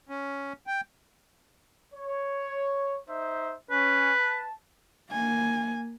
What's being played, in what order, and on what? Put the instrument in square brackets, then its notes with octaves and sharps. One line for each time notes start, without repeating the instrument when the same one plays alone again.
[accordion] C#4
G5
[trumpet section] C#5
D#4 C5 E5
[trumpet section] C#4 [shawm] B4
[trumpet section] A5
[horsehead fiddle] A#3 G#5